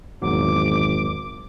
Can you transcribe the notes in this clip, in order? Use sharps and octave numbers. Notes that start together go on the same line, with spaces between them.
G#1 E2 A#2 F#3 D6